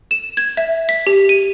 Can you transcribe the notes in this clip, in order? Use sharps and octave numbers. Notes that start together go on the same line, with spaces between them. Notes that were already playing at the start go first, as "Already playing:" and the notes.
E7
G#6
E5
B6
G4
D#7